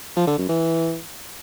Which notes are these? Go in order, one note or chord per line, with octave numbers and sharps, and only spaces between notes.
F3
D3
F#2
E3